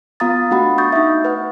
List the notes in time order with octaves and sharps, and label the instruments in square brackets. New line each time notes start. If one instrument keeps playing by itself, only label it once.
[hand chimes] B3 F4 F5 A#5 D#6 A6
A3 D4 F#4 F#5 B5
C#6 D#6 G6 A6
D#4 E5
B4 F#5